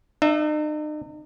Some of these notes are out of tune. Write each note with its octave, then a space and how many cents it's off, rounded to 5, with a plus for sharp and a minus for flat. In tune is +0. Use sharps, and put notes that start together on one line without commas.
D#4 -45 E5 +0